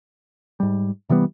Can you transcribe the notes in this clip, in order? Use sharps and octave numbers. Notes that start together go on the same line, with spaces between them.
G#2 G3
C3 E3 G3 B3